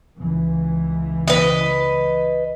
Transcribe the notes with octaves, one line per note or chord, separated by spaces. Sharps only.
C#2 E3
B4 D#5